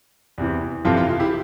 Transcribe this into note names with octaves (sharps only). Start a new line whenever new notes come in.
E2 C3 E3
F2 C3 E3 F4 A4
F4
F4
E4 G4